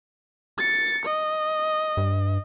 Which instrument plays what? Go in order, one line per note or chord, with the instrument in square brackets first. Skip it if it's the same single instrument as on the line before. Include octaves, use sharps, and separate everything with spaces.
[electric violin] A6 C#7
D#5
[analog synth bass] G2